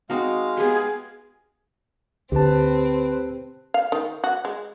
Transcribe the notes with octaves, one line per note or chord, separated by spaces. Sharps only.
G#3 C4 D#4 F#4 F5
B3 G4 G#4
D2 C4 G4 B4 A5
F5
D#3
F#4
G#3